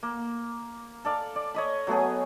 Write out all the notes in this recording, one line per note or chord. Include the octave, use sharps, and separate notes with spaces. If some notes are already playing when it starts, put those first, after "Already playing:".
A#3
A4 D5 F5
D5
C#5 D#5 B5
F#3 A3 B3 G#4